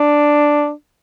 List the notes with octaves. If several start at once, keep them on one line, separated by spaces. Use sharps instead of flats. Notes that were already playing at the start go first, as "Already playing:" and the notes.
Already playing: D4